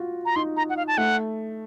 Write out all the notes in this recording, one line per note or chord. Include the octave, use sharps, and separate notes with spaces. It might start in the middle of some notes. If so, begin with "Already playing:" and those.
Already playing: F4 F#4
A#5
D#4 C6
A#5
F#5
F5
A5
A3 F#5